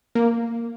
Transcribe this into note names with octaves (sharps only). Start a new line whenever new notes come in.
A#3